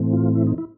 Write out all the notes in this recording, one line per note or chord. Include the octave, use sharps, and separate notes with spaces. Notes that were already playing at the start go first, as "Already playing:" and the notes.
Already playing: A2 E3 A3 C4
F4
E4
D#4
E4